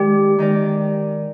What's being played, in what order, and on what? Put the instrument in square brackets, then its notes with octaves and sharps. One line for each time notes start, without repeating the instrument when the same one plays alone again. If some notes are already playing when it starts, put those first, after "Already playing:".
Already playing: [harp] D#3 G#3 D#4 A#4 D5 [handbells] G4
[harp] D#3 G#3 D#4 A#4 D5